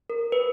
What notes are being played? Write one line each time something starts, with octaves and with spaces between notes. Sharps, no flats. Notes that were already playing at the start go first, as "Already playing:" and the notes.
A#4
B4